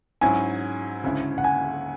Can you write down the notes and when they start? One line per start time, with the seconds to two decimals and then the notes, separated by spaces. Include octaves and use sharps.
0.21 G#2 F#3 C#4 E4 G#5
1.03 D2 C#3 G#3 C#4 E4
1.38 F#5
1.44 G#5